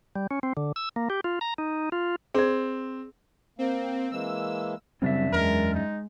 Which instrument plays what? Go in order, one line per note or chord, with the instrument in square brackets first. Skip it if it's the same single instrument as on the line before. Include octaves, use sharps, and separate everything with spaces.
[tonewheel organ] G3
C#4
C4
D3
E6
A#3
G4
F4
A#5
D#4
F4
[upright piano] C4 [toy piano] G#4 D5
[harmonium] A#3 [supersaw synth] C4
[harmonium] E3 G#3 A#3 [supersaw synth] E6
[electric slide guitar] F#2 D4 E5 [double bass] C#3 [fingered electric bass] G3 C4
[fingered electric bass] E2 [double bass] G#3 [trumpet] A#4
[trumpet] D#4